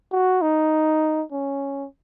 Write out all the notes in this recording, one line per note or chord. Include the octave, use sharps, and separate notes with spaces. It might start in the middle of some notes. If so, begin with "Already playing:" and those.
F#4
D#4
C#4